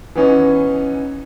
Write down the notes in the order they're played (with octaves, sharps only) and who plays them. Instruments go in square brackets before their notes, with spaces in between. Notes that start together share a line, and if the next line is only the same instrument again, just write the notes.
[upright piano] E3 B3 C#4 D#4